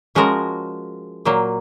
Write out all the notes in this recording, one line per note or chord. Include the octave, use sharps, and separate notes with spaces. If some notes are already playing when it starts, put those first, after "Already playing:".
F3 G#3 C#4 F#4 A#4
A#2 F#3 A#3